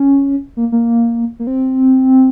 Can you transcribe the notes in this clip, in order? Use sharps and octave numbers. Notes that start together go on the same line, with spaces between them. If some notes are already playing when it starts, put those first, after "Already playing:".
Already playing: C#4
A#3
A#3
A#3
C4